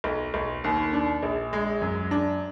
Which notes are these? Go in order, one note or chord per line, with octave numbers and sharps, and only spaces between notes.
B1
B1
D#2
D4
A#1
G#3
F#2
D4